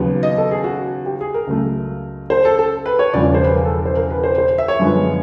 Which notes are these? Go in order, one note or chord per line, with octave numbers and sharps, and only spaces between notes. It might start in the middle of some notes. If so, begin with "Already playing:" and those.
Already playing: D#2 C#3 F#3 B3
D#5
A4
G#4
F#4
G4
G#4
A#4
C#2 C#3 F#3 A3
C5
A4
A4
B4
C#5
E1 E2 C#3 F3 D5
C5
B4
A#4
A4
C5
A#4
B4
C5
C5
E5
C#5
F#2 D3 F3 G#3 B3